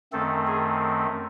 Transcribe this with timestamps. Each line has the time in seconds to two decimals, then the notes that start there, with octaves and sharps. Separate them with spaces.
0.12 F#2 D#3 A3 C4 A4
0.47 G#4